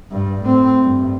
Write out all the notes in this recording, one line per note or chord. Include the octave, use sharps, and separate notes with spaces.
G2
A2 C4
G2